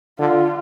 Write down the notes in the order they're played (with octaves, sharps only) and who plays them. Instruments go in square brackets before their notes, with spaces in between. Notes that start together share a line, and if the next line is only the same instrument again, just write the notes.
[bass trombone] D3 [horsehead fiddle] F4